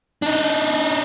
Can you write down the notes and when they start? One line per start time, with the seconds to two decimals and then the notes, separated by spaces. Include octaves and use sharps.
0.22 D4 D#4